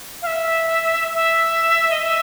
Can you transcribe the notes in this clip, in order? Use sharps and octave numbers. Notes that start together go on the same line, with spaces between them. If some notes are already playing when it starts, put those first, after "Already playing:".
F5
E5
E5
D#5
E5